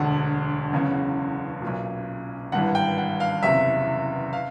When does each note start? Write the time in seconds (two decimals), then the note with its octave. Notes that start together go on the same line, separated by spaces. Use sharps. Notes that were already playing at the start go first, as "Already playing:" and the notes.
Already playing: E1 D2 D3 F#5
0.72 F#1 E2 C#3
1.62 B1 A#2
2.52 G#1 G2 E3 F#5
2.75 G5
2.98 F#5
3.20 F5
3.43 F#1 E2 C3 E5
4.33 F5